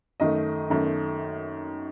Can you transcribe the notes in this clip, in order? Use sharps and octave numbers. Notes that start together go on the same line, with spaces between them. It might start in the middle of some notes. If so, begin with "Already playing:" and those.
F#2 D#3 A3 D#5
F#2 D#3 A3